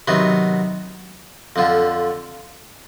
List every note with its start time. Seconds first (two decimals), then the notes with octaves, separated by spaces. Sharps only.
0.08 C3 D#3 F#3 B3
1.56 F2 D3 F3